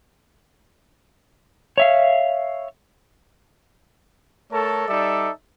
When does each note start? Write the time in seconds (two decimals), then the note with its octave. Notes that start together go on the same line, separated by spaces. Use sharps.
1.78 C#5 E5 F5
4.52 A3 A4 A#4 C#5 A5
4.88 G3 D#4 A4 D5 E5